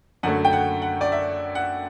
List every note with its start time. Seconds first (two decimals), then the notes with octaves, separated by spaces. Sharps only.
0.23 F#2 D3 F#3 A3 F#5
0.45 G5
0.53 F#5
0.82 F#5
1.01 D5
1.12 E5
1.55 F#5